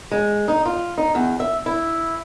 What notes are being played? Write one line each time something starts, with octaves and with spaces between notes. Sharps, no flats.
G#3
D#4
F4
D#4
E2
E5
E4